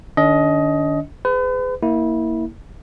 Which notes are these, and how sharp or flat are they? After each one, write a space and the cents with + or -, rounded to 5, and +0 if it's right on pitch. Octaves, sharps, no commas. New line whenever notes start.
D#3 -40 D4 -45 D#5 +15
G#4 +0 B4 +40
A#3 +0 E4 -25